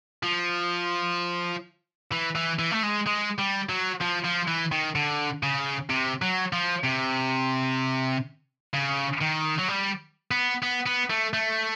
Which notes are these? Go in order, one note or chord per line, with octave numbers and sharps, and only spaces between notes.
F3
E3
E3
E3
A3
G#3
G#3
G3
F#3
F3
F3
E3
D#3
D3
C#3
C3
F#3
F3
C3
C#3
D#3
F#3
G3
B3
B3
B3
A3
A3